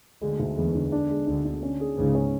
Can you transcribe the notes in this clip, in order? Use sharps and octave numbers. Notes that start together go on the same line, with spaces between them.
D2 D3 G#3
D2
E2 E3 G#3
D3
D4
G#3
D2 D3 D4
D4
C#4
G#4
C#2 G#2 C#3
C#4